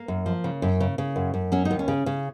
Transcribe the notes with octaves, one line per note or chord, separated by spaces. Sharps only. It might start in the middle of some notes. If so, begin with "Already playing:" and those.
Already playing: A#3
F#2
F3
C#3
F#2
C#3
C#3
F#2
F#2
F#3 C#4
D#4
D#2
C#4
C#3
C#3